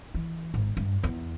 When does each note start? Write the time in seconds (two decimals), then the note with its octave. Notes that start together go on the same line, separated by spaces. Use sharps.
0.14 E3
0.54 G#1
0.77 G2
1.03 E2